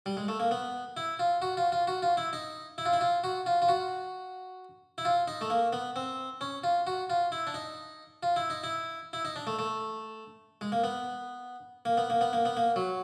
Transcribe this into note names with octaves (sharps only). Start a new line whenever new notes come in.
G3
G#3
A3
A#3
B3
E4
F4
F#4
F4
F4
F#4
F4
E4
D#4
E4
F4
E4
F4
F#4
F4
F4
F#4
E4
F4
D#4
A3
A#3
B3
C4
C#4
F4
F#4
F4
E4
D4
D#4
F4
E4
D#4
E4
E4
D#4
D4
A3
A3
G#3
A#3
B3
A#3
B3
A#3
B3
A#3
B3
A#3
F#3